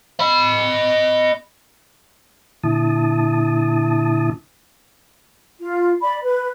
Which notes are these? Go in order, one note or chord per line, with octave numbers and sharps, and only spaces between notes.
D#5 B5
A#2 D3 E4 A5 D#6
F4
D5 B5
B4